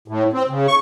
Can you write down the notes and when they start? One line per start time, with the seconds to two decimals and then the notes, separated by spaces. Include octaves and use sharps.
0.08 A2
0.33 C4
0.49 C#3
0.67 C#6